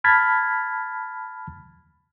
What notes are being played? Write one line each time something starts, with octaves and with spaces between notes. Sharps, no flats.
A5 B5 F6 G#6 A6 B6